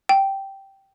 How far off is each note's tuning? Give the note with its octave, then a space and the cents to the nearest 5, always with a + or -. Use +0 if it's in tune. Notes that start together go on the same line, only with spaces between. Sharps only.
G5 -10